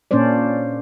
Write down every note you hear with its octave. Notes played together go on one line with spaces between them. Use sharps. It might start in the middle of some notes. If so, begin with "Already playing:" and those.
A#2 A#3 C#4 D4 C5 D5